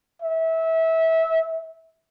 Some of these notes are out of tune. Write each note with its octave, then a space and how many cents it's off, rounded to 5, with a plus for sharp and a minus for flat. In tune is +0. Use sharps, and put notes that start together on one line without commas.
E5 -20